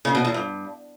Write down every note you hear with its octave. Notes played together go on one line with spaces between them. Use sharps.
C#3
B2
E2
G2